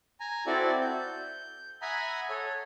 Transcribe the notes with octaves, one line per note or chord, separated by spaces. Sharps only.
G#5 A#5
C4 E4 F#4 A4 D5
G6
E5 F#5 G#5 A#5 B5 D#6
A4 C#5